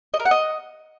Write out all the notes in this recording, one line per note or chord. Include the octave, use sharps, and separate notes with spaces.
D#5
A#4
F#5
D#5